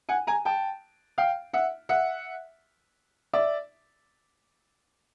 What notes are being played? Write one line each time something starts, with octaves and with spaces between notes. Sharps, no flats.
F#5 G#5
G#5 A#5
G5 A5
F5 G5
E5 F#5
E5 F#5
D5 E5